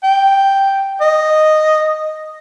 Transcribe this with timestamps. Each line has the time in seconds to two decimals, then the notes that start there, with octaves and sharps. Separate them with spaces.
0.04 G5
1.01 D#5